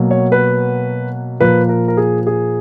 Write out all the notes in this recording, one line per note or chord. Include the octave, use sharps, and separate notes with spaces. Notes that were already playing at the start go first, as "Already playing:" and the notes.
Already playing: B2 F#3 A#3
C#5
B4
A#2 F3 A#3 B4
A#4
A#4
G#4
G#4